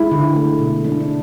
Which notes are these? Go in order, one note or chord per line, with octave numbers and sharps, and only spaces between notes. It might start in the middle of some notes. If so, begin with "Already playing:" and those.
Already playing: G#3 E4
D3
A3
B2
G#3 D4
D4
C3